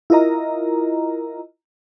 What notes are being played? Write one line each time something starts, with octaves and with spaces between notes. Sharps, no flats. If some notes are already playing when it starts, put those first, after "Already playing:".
E4 F4 A#4 D#5 A#5